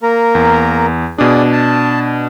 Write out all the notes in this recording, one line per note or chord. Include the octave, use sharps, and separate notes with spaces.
A#3 A#4 A#5
E2
B2 D4 G#4 D5 D#6
A5